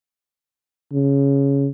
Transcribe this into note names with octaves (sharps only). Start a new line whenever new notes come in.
C#3